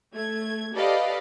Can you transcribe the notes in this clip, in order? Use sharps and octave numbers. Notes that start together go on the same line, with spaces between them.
A3 G#6
G4 A4 B4 D5 D#5 F5